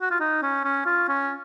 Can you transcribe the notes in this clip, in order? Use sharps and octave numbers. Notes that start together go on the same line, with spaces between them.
F#4
F4
D#4
C#4
C#4
F4
C#4